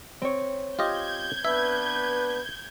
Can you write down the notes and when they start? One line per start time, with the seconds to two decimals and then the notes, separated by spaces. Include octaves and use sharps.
0.22 C4 C#5
0.79 F4 G4 D#5 G6 G#6
1.45 B3 D4 B4 E5